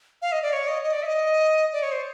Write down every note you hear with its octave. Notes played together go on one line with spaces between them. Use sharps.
F5
D#5
D5
C#5
D#5
D#5
D5
E5
D#5
D5
C#5
C5